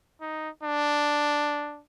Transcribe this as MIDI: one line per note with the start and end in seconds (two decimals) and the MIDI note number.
0.21 0.50 63
0.63 1.82 62